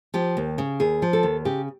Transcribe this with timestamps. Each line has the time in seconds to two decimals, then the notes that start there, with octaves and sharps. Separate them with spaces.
0.14 F3 G4
0.37 D#2
0.58 C#3
0.80 D#2 G#4
1.02 F3
1.13 A4
1.23 D#2
1.45 C#3 G4